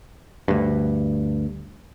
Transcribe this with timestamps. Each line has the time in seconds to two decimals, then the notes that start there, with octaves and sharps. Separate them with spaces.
0.48 D2 G2